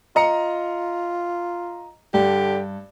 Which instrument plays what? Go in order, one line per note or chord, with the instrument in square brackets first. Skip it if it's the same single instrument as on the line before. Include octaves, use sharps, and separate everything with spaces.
[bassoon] F4 [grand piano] D#5 A#5 C#7
[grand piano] G2 [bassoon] D3 [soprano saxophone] G4